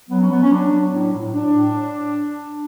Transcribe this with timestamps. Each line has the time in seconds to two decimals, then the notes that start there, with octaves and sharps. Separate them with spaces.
0.09 F#3 B3
0.20 C#4
0.30 F#3 B3
0.42 C#4
0.51 F#3 D4
0.72 F#3
0.92 A2
1.13 A2
1.34 A2 D4
1.54 A2